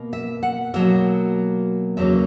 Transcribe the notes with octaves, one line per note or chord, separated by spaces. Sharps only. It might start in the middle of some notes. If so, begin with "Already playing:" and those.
Already playing: B2 A#3
E5
F#5
B2 F#3 A#3 E5
E2 C#3 F#3 A#3 E5